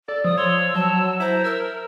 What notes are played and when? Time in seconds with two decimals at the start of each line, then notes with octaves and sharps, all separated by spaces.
0.08 A4 D5
0.24 F3 D#6
0.37 C#5 C6 E6
0.75 F#3 A5
1.20 E4 C5 A#5
1.44 A#4 E6